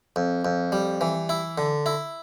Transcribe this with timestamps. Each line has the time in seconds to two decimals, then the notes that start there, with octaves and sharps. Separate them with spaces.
0.16 F2
0.45 F2
0.72 G3
1.01 E3
1.29 E4
1.58 D3
1.86 E4